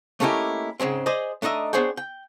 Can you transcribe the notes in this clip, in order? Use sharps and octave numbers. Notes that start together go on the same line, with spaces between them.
A3 A#3 C#4 D#4 E4 G4
G#2 C#3 G#3 C4
G#4 C5 D5 D#5
A3 D4 D#4 D#5 E5
B3 D4 G#4 C5 C#5 G5
G5